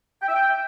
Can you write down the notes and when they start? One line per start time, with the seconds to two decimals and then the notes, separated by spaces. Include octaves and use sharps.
0.21 G5
0.27 E5
0.34 G5